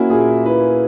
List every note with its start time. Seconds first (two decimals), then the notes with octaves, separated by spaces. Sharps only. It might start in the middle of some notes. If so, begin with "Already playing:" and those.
Already playing: A#3 C#4 E4 F#4
0.10 A#2 G#4
0.45 E4 B4